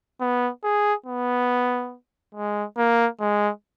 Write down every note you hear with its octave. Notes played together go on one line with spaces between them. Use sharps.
B3
G#4
B3
G#3
A#3
G#3